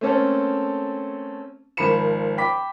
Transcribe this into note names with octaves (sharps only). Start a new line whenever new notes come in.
A3 A#3 C4 C#4 A4
G#1 F3 A#4 B5 C#7 E7
G5 B5 D6 B6